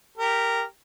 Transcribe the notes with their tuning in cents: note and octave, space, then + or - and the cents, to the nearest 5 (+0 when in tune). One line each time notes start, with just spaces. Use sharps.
G4 +0 A#4 -10